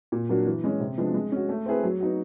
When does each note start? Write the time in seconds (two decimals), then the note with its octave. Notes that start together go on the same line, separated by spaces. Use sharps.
0.12 A#2
0.29 F#3 A#3 D4 F#4
0.46 E3
0.64 G#3 C#4
0.80 C3
0.98 F3 G#3 B3 D4
1.14 G#3
1.32 C#4 F#4
1.49 A3
1.66 C4 E4 G#4 B4
1.83 F#3
2.00 B3 D#4 F#4